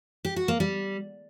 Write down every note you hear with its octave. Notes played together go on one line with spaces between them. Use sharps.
G4
F#4
A#3
G3